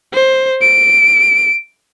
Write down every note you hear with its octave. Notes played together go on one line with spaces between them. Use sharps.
C5
D7